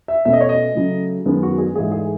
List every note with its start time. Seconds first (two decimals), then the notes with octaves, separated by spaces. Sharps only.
0.08 E5
0.25 B2 A3 C#4 E5
0.33 D#5
0.41 C#5
0.49 D#5
0.75 C#3 F#3 A3
1.26 F#2 D#3 G#3 B3
1.43 F#4
1.58 G#4
1.76 G#2 E3 A3 G#4
1.92 G#4